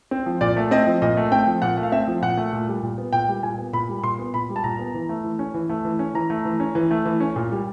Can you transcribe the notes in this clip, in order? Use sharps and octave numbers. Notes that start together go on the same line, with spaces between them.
C4
F3
A#2 D5
A3
C4 D#5
F3
A#2 D#5
A3
C4 G5
F3
A#2 F#5
A3
F5
C4 E5
F3
A#2 F#5
A3
A#2
G3
A#2
B3
A#2 G5
G3
A#2 G#5
B3
A#2 B5
G3
A#2 C6
B3
A#2 B5
G3
A5
A#2 A#5
B3
E3
A3
E3
C#4
E3
A3
E3
C#4
E3 A#5
A3
E3
C#4
E3
A3
E3
C#4
A#2
G3